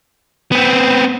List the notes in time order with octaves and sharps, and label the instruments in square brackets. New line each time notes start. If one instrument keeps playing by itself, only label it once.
[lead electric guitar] B3 C4